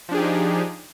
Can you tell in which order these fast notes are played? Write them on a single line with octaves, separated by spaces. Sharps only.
F3 D4 G#4 G4 D#4